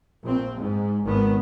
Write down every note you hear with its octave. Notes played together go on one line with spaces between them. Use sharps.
A#1 C4
G#2
G#1 D#3 B3